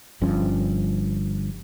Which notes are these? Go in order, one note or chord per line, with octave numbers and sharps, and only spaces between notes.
G1 G2 F3 C#4